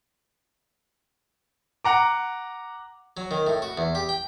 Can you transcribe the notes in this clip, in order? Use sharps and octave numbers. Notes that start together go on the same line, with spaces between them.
F#5 A#5 D6
F#3
D#3
A2
F#4
E2
G4
G5